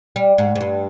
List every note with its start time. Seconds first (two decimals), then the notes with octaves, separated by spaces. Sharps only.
0.16 G3
0.38 G#2
0.55 G#2
0.61 G2